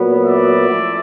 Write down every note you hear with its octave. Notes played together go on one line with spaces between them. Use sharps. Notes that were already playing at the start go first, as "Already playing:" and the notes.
Already playing: A#2 F#3 B3
D5 E5
A2 F3 A3 C#4